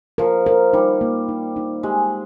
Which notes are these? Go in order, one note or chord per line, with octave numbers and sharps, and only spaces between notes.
F3 A#4
A#4
G3 D#4
A#3
D#4
D#4
G#3 G4